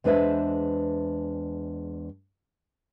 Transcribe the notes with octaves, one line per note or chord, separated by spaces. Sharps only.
E2 G#3 D4 B4 C5 E5